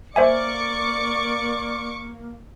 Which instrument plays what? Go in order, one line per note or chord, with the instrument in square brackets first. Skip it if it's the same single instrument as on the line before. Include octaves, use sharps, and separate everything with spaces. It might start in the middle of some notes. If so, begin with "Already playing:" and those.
[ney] A#3 [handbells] C5 E5 G#5 [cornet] D5 [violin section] C#6 D6 C#7